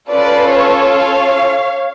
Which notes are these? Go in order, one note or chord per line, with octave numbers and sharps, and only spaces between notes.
C#4 F4 A4 B4 D5
C#5
C#5 F5